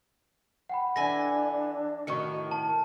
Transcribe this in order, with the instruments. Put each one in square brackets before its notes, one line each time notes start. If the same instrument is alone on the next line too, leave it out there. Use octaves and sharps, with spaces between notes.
[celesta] F#5 G5 B5
[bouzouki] E3 A4 G#5 [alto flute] D4 [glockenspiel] A#6
[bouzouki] A2 D#3 [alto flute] F#4 [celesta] C#6 C#7
[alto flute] A#4 [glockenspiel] A5